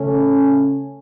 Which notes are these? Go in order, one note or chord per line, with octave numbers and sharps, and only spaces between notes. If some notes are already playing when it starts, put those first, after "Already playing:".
Already playing: C#3 A3 C#4 A4